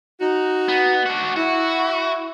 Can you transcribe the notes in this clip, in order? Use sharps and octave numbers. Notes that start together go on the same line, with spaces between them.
D#4 F#4
B3
D4 F#4
E4 F#4